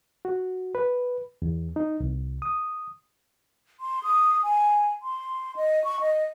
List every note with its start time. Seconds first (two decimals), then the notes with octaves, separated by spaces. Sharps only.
0.25 F#4
0.75 B4
1.42 E2
1.76 D#4
2.00 C2
2.42 D#6
3.80 C6
4.03 D#6
4.43 G#5
5.03 C6
5.56 D#5
5.84 C#6
6.01 D#5